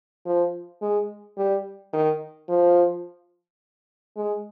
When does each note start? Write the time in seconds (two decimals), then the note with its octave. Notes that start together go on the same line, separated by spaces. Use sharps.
0.26 F3
0.82 G#3
1.37 G3
1.93 D#3
2.49 F3
4.16 G#3